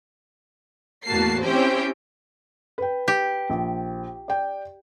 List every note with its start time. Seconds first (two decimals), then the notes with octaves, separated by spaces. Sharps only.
1.06 E2 A2 A#3 F#4 A5 C7
1.44 C4 C#4 E4 G4 C5 G5
2.78 B4 G5
3.08 G4
3.50 A#1
4.28 D5 G5